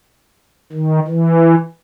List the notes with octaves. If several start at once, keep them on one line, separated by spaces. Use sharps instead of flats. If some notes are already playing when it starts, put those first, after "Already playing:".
D#3
E3